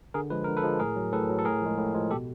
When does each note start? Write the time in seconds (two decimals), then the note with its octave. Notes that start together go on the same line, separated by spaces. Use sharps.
0.14 D3 G#4 A#4
0.30 F3 G#3 B4
0.44 D3 A#4
0.57 A4 B4
0.64 F3 G#3
0.80 A2 G#4 A#4
0.96 F#3
1.13 A2 A4 B4
1.29 F#3
1.39 A4
1.45 A2 G#4 A#4
1.62 F3 G#3
1.78 A2
1.95 F3 G#3
2.11 B2 G4 A4